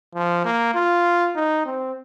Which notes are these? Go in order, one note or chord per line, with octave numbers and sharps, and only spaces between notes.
F3
A#3
F4
D#4
C4